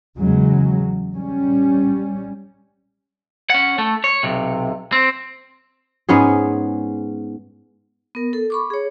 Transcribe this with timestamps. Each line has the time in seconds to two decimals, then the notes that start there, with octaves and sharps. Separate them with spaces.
0.18 E2 C#3 F#3 G#3
1.15 G3 C#4
3.50 C#4 F#5
3.78 A3
4.04 C#5
4.23 B1 C3
4.92 C4
6.09 G#2 B3 C#4 G#4
8.15 B3 A#4
8.33 A4
8.50 B5 C#6 D6
8.70 G#4 C#5